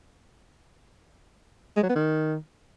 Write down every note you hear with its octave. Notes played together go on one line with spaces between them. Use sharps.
G#3
F#3
B3
D#3